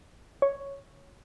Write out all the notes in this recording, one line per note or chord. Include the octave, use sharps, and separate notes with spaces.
C#5